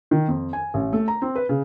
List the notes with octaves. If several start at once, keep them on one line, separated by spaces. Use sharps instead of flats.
D#3
F2
G#5
A1
A3
A#5
C4
B4
C#3